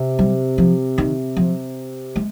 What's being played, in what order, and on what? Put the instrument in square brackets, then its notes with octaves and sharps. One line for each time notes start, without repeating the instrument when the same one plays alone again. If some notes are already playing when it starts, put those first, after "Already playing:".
Already playing: [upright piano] C3
[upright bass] G3
F3
D#3
F3
G#3